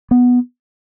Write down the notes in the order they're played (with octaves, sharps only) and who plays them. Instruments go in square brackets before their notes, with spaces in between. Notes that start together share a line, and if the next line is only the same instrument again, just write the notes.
[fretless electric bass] B3